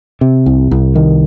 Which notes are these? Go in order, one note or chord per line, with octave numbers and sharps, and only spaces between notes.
C3
C2
C2
D#3